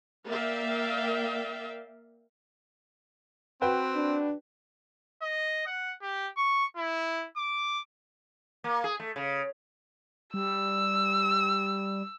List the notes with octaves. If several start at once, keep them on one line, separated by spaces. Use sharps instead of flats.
A#3 A#4 D5 E5 F5 G5
C4 F#4 B4 G5
D4
D#5
F#5
G4
C#6
E4
D6
A#3
G#4
A3
C#3
G3 E6